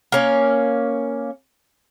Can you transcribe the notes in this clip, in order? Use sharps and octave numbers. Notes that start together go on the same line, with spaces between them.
A#3 C#4